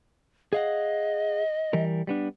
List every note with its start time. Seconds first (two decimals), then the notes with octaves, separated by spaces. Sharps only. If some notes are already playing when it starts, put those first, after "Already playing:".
0.53 G#4 D#5 F5 F#5
1.73 E3 G3 A#4
2.07 G3 B3 D4